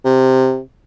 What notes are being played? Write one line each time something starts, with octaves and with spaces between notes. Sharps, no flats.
C3